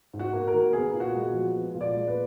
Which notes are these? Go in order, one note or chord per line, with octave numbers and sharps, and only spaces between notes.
G#2
F#4
A#3
A#4
D#3
B3 G#4
A#2
F#4
G#3
F3
B3
A#2
D5
G#3
B4